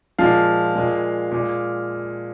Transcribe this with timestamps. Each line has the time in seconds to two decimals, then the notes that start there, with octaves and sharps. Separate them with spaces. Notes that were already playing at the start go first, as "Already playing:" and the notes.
0.18 A#2 F3 G#3 F5
0.75 A#2 G#3
1.31 A#2 G#3